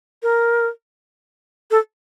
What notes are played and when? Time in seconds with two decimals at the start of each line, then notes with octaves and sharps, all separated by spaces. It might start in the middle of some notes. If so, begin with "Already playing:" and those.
0.23 A#4
1.71 A4